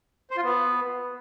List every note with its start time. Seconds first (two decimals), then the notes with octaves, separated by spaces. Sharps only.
0.31 C5
0.37 F4
0.43 B3